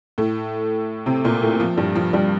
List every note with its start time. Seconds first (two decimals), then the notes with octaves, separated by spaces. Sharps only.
0.18 A2 A3
1.06 C3 C4
1.24 A#2 A#3
1.42 A2 A3
1.60 F3
1.77 G2 G3
1.95 F3
2.13 G2 G3